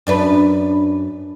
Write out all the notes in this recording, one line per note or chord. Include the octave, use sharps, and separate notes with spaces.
F#2 D4 B4